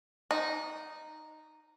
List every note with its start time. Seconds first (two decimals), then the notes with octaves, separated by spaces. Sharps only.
0.31 D#4